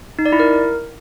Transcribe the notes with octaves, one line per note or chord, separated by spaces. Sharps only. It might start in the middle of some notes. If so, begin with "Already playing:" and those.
D#4
D5
E4
A#4